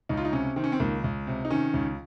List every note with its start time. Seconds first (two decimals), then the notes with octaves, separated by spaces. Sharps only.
0.09 C#2 D#4
0.17 F4
0.25 D#4
0.32 C3 C#4
0.56 D#3 C4
0.64 C#4
0.72 C4
0.80 C#2 A#3
1.04 C#2
1.27 C3
1.45 D#4
1.51 D#3 C#4
1.74 C#2